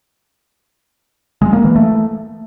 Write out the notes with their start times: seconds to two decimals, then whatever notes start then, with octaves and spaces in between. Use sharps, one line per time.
1.42 G#3
1.53 A#3
1.64 E3
1.76 A3